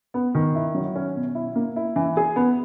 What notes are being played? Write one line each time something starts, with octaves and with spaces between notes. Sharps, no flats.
B3
D#3
E4
F#3
C#4
B2
E4
A#3
E4
E3
G#4
B3